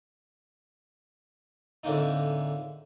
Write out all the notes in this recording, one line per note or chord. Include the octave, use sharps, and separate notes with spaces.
F2 A2 D3 G#3 A#3 D#4